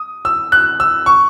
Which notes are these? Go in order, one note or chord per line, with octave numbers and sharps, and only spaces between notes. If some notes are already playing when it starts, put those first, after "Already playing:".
Already playing: D#6
E6
F#6
E6
C#6